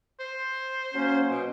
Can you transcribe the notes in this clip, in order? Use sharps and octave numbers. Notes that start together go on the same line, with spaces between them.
C5
F#3 A#3 C#4
B2